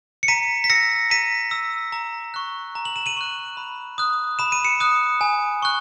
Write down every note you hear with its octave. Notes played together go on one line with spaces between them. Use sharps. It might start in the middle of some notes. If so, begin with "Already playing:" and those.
C#7
A#5 B6 D#7
B6
E6 A#6 C#7
A#5 B6 D#7
E6
A#5
C#6 F#6
A#5
F#7
E7
D#7 F#7
C#6 F#6
B5
D#6 F#6
B5 E7
D#7
C#7 E7
D#6 F#6
G#5
C#6 F#6